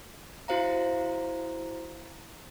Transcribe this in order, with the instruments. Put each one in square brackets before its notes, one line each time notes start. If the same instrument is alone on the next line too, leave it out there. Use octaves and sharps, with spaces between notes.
[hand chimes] E4 F#4 C5 F5 A#5